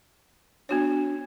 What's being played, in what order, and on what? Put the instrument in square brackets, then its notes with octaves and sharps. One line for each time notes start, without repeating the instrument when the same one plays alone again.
[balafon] B3 F#4 C#5 [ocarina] D4